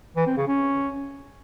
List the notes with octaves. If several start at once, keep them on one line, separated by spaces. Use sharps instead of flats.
E3
C4
C#3
C#4